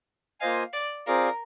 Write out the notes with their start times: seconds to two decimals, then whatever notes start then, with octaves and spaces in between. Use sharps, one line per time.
0.40 A#3 F4 C5 D#5 F5 G#5
0.73 D5
1.07 C4 F4 G#4 A#4 D5 F5